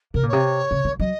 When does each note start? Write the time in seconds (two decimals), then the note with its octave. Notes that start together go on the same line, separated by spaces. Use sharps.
0.14 C3 A#4
0.23 A#2
0.28 C3 C#5
0.71 C#3
0.85 D#3
1.00 F#3 D#5